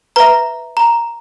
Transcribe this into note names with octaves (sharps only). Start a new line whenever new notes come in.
B4 E5 A#5
A#5